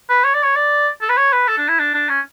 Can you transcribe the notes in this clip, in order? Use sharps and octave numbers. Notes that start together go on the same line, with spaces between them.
B4
C#5
D5
C#5
D5
A4
B4
C#5
B4
A4
D4
E4
D4
D4
C#4